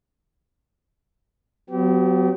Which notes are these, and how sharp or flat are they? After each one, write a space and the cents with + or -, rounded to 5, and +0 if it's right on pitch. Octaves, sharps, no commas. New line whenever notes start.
F#3 -10 B3 +35 G4 -30